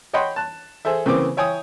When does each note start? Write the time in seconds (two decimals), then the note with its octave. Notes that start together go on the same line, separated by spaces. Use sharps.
0.13 C#5 D#5 F#5 G5 B5 C6
0.36 A5 F#6
0.85 G#4 A4 C5 E5
1.06 C#3 E3 A#3 C4 C5 D6
1.37 E4 C#5 G5 G#5 C#6 D#6